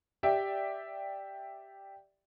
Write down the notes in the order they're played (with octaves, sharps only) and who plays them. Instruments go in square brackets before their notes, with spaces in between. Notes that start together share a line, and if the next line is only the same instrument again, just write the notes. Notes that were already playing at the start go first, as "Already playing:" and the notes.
[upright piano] G4 D5 E5 G5